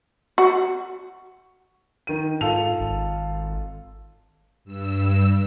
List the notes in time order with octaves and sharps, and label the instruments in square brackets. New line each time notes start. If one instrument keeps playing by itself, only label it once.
[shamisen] F#4
[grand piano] D#3 D#7
[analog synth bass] G#2 [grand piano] F4 A4 F7
[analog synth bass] G#1
[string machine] G2 E6